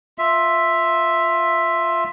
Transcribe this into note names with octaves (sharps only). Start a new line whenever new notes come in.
F4 E5